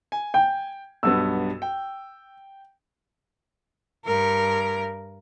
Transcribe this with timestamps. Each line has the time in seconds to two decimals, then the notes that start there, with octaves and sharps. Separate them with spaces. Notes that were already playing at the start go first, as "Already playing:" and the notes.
0.12 G#5
0.34 G5
1.03 B1 G2 B3 E6
1.62 G5
4.05 G2 A#4